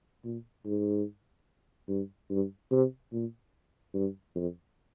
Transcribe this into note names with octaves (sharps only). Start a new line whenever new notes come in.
A#2
G#2
G2
G2
C3
A#2
G2
F2